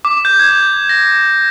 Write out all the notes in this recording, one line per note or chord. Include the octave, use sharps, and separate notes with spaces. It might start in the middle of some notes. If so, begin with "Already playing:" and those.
D6
G6
G#6
A#6